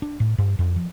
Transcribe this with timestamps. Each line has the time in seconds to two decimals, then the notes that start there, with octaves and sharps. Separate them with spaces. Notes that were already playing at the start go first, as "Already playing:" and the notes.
0.02 D4
0.20 A2
0.38 G2
0.59 F2
0.76 F3